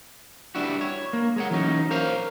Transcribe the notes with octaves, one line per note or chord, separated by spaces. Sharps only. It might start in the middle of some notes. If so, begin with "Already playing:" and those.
G3 D4 E4 F#4
C#5
A#3
G#3 C#5 F#5
E3 F#3 C#4 D#4
A#4 C5 C#5 F5 A#5